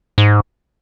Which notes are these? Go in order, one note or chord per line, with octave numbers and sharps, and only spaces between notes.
G#2